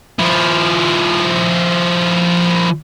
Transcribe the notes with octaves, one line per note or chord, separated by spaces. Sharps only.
F3 E4